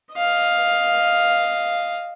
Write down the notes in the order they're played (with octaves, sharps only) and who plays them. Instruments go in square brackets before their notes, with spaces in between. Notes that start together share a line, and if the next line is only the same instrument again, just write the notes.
[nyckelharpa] D#5 F5